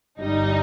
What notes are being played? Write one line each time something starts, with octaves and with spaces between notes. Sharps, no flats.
G1 G2 G3 D#4